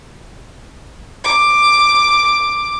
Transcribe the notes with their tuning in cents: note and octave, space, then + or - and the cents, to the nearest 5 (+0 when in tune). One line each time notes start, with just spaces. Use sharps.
D6 +10